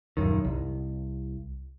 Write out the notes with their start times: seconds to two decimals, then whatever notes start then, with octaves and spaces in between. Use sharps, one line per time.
0.17 D#1 C2 F#2 D#3
0.45 C2